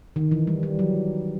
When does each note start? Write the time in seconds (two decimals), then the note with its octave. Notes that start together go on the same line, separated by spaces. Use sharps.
0.16 D#3
0.31 E3
0.47 G3
0.63 G3
0.79 F#3